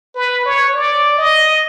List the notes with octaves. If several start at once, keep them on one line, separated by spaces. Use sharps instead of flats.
B4
C#5
D5
D#5